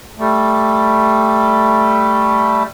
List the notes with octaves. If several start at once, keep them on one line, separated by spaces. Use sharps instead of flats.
G3 A3